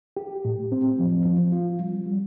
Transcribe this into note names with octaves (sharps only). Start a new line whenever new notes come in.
G4
A2
C4
F3
F3
F4
G3
G3